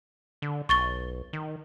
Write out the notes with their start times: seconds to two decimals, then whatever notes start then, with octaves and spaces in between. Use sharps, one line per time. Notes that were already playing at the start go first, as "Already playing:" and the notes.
0.42 D3
0.69 B1 C#6 A6 G7
1.33 D#3